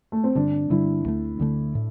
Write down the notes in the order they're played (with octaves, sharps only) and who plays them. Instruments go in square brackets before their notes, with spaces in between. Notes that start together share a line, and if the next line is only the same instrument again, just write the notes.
[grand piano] A3
C4
[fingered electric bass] G2 D3 G3 [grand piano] D4
[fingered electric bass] G2 D3 G3 [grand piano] E4
[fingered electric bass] D2 D3 A3
D2 D3 A3
A2